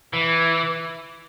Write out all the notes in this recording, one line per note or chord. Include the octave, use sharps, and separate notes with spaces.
E3